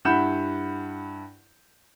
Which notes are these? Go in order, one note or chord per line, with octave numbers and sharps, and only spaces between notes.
G2 E4 F#5 B5 G6 E7